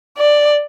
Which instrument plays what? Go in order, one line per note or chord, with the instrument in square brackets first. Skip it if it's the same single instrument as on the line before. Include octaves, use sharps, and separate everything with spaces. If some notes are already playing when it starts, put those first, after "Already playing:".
[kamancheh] D5